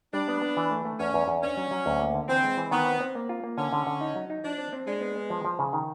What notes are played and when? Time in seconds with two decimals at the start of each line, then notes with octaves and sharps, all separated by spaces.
0.13 G3 D4
0.28 B3
0.42 B3
0.57 E3
0.71 A3
0.85 A3
1.00 E2 C#4
1.14 E2
1.28 E2
1.43 C#4 D4
1.57 F#3
1.71 F#3
1.86 D2
2.00 A#3
2.14 D3
2.29 E3 C4
2.44 G#3
2.57 E3
2.71 D#3 B3
2.86 C4
3.00 C4
3.15 A#3
3.29 F4
3.44 A#3
3.58 D3 C#4
3.73 D3
3.87 D3
4.01 D#4
4.16 F#3
4.30 D#4
4.44 F3 D4
4.58 C4
4.73 C4
4.87 G#3 D4
5.01 B3
5.16 B3
5.30 F3
5.45 F3
5.59 C#3
5.73 D#3